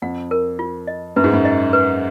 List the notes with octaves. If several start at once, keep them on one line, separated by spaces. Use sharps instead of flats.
F2 F#5
A#4
F4
D#5
F#2 B4
G#2
F#2
D#5
B4